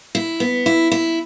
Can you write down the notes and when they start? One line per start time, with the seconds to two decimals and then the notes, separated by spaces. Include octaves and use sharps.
0.15 E4
0.40 B3
0.66 E4
0.92 E4